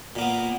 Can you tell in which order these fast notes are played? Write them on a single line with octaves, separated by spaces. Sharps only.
A#2 A#3 B3